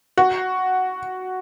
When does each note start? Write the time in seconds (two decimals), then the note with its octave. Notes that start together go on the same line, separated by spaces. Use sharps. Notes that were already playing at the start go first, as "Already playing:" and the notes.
0.18 F#4